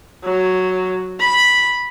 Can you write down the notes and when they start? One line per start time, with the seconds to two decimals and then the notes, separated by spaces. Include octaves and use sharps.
0.25 F#3
1.20 B5